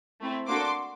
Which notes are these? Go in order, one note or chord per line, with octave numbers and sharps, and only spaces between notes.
A3 C4 E4
A#3 D4 F#4 A4 C6 D6